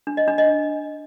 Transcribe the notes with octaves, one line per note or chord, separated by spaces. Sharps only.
D4
D#5
D4
D#5